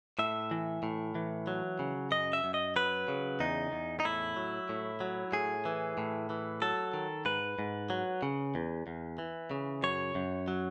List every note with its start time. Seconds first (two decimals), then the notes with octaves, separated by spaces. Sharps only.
0.19 A2 E5
0.51 E3
0.83 A2
1.15 E3
1.47 F#3
1.79 C#3
2.11 F#2 D#5
2.33 E5
2.44 F#2
2.54 D#5
2.76 F#3 B4
3.08 C#3
3.40 E2 D#4
3.72 E2
4.00 D#4
4.05 A2 E4
4.36 F#3
4.69 A2
5.01 F#3
5.33 A2 G#4
5.65 E3
5.98 A2
6.30 E3
6.62 F#3 A4
6.94 D#3
7.25 G#2 B4
7.59 G#2
7.90 F#3
8.22 C#3
8.55 E2
8.87 E2
9.18 E3
9.51 C#3
9.83 F#2 C#5
10.15 F#2
10.48 F#3